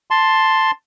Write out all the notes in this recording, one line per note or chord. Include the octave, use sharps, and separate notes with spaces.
A5 C6